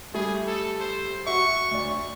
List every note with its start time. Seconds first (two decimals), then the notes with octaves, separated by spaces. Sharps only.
0.14 G3 A3 G#4
0.47 A4
0.80 C5
1.26 F#4 E5 C#6
1.71 D2 D5